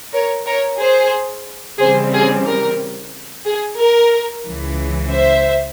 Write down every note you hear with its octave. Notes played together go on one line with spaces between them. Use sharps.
A#4 C#5
A#4 C#5
G#4 C5
C#3 E3 G3 C4 G#4 C5
G#4
A#4
G#4
A#4
C#2 C#3 E3
C5 E5